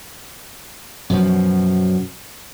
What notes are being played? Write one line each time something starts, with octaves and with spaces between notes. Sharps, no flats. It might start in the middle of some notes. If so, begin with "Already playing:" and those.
F#2 B2 F3